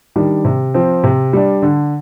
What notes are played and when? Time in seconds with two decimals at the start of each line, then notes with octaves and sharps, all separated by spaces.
0.16 D#3 G3 D4
0.45 C3
0.74 F3 C4
1.04 C3
1.33 G3 D4
1.62 D3